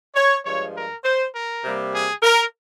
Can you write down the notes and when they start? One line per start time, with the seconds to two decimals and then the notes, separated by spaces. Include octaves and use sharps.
0.15 C#5
0.45 G2 F3 G#3 C#5
0.75 A#4
1.04 C5
1.34 A#4
1.63 C3 G3 A#3
1.93 G#4
2.23 A#4